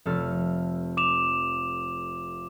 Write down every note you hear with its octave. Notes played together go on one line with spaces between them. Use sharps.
F1 A4 F6
D6 E7 F7